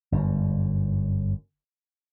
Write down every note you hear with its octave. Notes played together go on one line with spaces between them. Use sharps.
G1 F#2